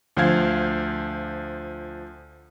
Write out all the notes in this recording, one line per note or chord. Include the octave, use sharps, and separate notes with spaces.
D2 F3 C5 F5 G#6